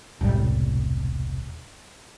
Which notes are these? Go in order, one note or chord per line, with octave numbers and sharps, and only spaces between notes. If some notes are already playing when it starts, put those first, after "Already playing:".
E1 C2 A2 G3